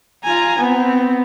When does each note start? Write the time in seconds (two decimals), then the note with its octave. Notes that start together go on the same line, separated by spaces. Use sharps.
0.24 F4 G#5 A#5
0.59 B3 C4